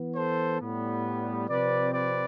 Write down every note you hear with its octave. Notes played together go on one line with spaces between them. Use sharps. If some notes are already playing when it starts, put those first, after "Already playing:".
Already playing: E3 B3
A4 C5
A2 G3 B3
C3 F3 C4 B4 D5
B4 D5